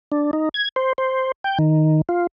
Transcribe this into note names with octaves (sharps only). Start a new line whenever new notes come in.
D4
D#4
G#6
C5
C5
G5
D#3
F4